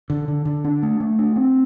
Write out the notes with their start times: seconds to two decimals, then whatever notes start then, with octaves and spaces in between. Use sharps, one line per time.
0.10 D3
0.28 D3
0.45 D3
0.64 D4
0.83 A3
1.00 A3
1.19 D4
1.36 C4